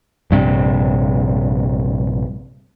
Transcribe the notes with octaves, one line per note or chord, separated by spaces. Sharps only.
A#1 G2 C3